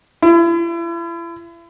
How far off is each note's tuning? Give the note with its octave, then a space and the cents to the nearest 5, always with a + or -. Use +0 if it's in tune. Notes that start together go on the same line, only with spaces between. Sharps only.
E4 +40